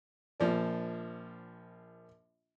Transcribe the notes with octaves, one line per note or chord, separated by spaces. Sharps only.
A#1 F3 D5